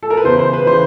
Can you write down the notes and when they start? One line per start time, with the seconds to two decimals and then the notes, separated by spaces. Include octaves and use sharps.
0.03 A4
0.10 A#4
0.17 B4
0.24 E2 C#3 E3 C5
0.39 C5
0.53 B4
0.66 C#3 E3 C5